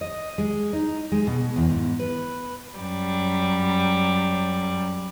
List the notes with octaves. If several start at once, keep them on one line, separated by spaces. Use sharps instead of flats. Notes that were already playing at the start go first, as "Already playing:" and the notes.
D#5
G#3
D#4
G#3
B2
E2
G#2
B4
F#2 G3